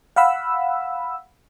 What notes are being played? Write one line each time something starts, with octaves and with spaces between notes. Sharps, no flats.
F5 F#5 B5 E6